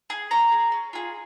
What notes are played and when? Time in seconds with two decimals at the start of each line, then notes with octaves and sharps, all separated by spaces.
0.10 G#4
0.31 C#4 A#5
0.52 G#4
0.72 C#4
0.93 F4 G#4